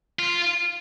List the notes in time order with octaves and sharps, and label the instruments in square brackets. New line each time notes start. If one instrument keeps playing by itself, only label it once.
[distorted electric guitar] F4